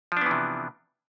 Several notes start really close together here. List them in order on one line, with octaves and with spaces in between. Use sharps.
F3 D4 B3 E3 C3